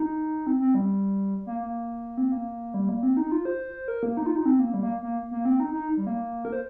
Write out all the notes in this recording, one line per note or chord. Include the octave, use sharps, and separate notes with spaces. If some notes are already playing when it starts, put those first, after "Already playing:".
Already playing: D#4
C4
C4
G3
A#3
A#3
C4
A#3
G3
A#3
C4
D#4
F4
C5
A#4
A#3
D#4
F4
D#4
C4
A#3
G3
A#3
A#3
A#3
C4
D#4
D#4
G3
A#3
A#4
C5